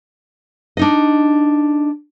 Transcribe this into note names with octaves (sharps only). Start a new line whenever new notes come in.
D4 D#4 D#5